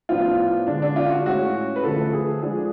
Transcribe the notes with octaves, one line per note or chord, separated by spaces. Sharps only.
A2 F3 B3 D4 F4
D3 G#3 D4
D4
F4
F#4
A2 G#3 C#4 F#4
B4
D3 F3 A3 A4
G#4
F3 G#3 D4 G#4